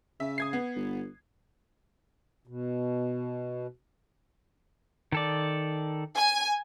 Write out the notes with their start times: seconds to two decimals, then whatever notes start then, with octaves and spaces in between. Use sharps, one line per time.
0.20 C#3 E5
0.38 D#6 G#6 C7
0.53 B3
0.76 G1
2.47 B2
5.12 D#3 A4 D5
6.17 G#5